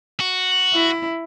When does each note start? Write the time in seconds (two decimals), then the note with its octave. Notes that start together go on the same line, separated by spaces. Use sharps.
0.20 F#4
0.74 E4